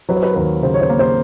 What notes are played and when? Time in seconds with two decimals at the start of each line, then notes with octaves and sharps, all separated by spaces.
0.09 F#3 B4
0.16 C5
0.23 B4
0.31 A#4
0.36 D#2 B4
0.63 C#3 C5
0.74 C#5
0.81 C5
0.89 A#3
0.99 C5